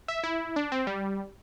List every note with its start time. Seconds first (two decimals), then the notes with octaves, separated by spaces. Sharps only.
0.08 E5
0.24 E4
0.56 D4
0.72 C4
0.87 G3